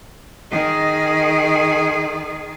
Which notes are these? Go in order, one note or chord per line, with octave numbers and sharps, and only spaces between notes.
D#3 G#4